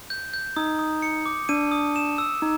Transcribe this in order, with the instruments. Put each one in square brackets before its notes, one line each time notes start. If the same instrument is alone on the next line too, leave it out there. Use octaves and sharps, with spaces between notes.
[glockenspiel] G6
G6
[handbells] D#4 [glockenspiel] D#6
[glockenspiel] D#6
C#7
D6
[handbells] D4 [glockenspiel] D#7
[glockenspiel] D#6
E7
E6
[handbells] D#4